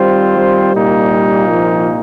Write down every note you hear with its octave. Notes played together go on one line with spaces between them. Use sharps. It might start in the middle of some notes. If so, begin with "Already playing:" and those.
Already playing: D#3 G3 C4 F4 C5
G3
C2 A#2 A#3 D#4
F3